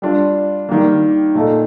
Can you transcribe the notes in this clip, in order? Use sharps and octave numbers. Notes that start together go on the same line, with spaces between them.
G3 D4 F4
D#3 G3 A#3
A#2 A3 D#4 A4